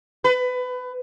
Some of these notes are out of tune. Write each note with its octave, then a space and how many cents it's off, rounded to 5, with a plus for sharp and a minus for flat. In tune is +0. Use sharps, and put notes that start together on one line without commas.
B4 +25